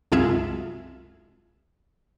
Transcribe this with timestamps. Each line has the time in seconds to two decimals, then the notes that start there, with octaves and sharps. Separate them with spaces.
0.12 C2 F#2 G#3 F4 G#4 E5